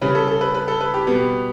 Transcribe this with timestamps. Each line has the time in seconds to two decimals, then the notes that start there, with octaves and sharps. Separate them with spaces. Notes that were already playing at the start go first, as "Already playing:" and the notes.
0.01 C#3 G3 C#4 B4
0.15 A4
0.28 A4
0.41 B4
0.54 B4
0.68 A4
0.81 B4
0.94 G4
1.07 B2 G3 B3